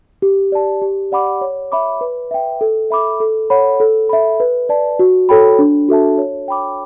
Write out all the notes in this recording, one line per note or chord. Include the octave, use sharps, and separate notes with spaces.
G4
D5 A5
G4
D5 F#5 B5 D6
C#5
E5 B5 D6
B4
E5 G5
A4
E5 B5 D6
A4
C#5 F#5 B5
A4
E5 B5
B4
D5 A5
F#4
A4 C#5 G5 B5
D4
F#4 A4 E5 A5
C#5
G5 B5 D6